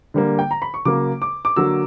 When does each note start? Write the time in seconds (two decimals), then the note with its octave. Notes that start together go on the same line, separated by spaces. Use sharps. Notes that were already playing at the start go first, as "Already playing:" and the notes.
0.14 D3 G3 A#3
0.39 G5
0.51 A#5
0.62 B5
0.74 C#6
0.85 C#3 F#3 A#3 D6
1.22 D6
1.45 D6
1.56 D3 F#3 A#3 E6